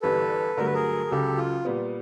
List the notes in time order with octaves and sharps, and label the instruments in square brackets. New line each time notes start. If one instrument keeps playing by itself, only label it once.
[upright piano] G1 G2 E3 G3 [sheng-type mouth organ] A4 B4
[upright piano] G2 D3 F#3 A3 [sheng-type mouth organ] A#4
[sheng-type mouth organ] B4
G#4 A#4
G#4
[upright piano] C#2 C#3 F#3 [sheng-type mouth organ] G4 A4
[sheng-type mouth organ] F4
[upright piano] A#2 G3 B3